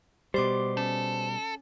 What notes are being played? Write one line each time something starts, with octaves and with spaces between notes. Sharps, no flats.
B2 G3 G4 C5 C6 D6
C#4 A4